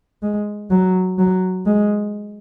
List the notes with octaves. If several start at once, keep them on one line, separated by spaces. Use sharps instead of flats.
G#3
F#3
F#3
G#3